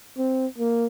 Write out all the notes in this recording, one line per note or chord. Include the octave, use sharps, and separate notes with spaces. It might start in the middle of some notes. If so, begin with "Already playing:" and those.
C4
A#3